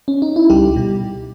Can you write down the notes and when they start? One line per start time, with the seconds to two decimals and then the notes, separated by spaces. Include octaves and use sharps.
0.08 C#4
0.22 D#4
0.36 E4
0.50 C#2 G3 G4
0.76 B2